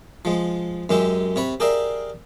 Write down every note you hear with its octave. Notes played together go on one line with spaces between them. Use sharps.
F3 G#3
F#2 G#3 C#4 G4 E5
C3 C#5 B5
G4 G#4 A#4 D5 E5 F5